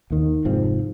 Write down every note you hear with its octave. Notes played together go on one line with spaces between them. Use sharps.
D#2 D#3
F1 G#2 F3 C4